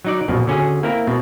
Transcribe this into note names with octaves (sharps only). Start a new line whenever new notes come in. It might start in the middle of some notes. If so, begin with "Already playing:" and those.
F#3 D#4 D5
A#1 F#2 B2 F3
D3 C#4 F#4 G#4
A#3 C4 E4 A#4
B2 C4